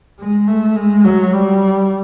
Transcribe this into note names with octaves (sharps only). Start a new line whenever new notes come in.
G#3
A3
G#3
F#3
G3